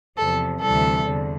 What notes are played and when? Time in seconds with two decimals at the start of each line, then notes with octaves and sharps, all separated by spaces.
0.17 E2 C3 F3 A4
0.62 D2 C3 E3 G3 A4
1.06 E2 D3